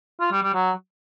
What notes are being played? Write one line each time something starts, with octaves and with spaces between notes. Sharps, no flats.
F4
G3
G3
F#3